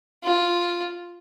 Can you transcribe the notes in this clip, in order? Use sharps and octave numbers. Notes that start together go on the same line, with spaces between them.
F4